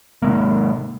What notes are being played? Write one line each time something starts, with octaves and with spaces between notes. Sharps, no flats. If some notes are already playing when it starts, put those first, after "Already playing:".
C3 G#3 A#3